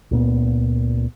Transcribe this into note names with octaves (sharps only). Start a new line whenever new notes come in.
C#2 A#2 B3